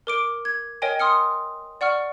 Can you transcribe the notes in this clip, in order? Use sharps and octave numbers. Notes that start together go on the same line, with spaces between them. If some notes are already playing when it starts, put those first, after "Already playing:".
A#4 D6 D7
G#6
A#4 C#5 D#5 G5 G#5
C6 D#6 F6 C#7
D5 F#5 C#6 F6